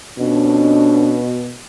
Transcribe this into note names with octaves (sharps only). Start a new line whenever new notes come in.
F2 B2 C#4 D4